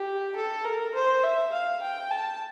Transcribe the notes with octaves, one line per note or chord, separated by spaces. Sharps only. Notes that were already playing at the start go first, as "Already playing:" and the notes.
Already playing: G4
A4
A#4
C5
E5
F5
G5
A5